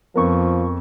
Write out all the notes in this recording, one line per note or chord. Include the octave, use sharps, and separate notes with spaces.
F2 F3 B3 A#4 C#6